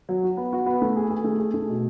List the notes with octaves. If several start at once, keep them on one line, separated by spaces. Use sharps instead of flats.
F#3
F#4
B3
F#4
B3
A3
G#4
G#4
A3
G#4
A3
B2